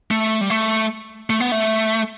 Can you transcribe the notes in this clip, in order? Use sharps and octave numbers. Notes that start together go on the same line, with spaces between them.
A3
G3
A3
A3
B3
A3